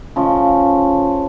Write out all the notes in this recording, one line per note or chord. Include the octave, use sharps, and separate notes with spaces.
C#3 F3 A3